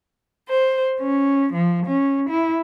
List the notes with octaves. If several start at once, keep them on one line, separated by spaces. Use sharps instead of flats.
C5
C#4
F3
C#4
E4